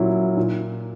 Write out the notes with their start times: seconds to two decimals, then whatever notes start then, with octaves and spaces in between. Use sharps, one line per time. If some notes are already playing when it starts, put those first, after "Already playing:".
Already playing: A#2 F#3 C#4 E4
0.37 A#2